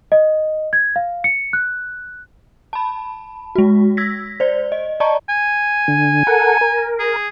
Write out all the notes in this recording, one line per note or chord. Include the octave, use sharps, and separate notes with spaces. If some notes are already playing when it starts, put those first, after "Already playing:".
D#5
G#6
F5
C#7
F#6
A5 B5
G#3 F#4
E6 G#6 A#6 B6
C5 D5
D#5
D5 D#5 A5 A#5 C#6
G#5
D3
A4 A#4 F#5
A#4
G#4